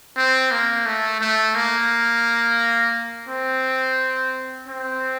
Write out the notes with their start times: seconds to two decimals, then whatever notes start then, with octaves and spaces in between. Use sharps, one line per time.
0.17 C4
0.51 A#3
0.86 A3
1.21 A3
1.55 A#3
3.29 C4
4.68 C4